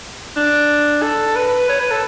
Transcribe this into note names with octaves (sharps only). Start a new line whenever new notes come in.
D4
A4
B4
C#5
B4
A4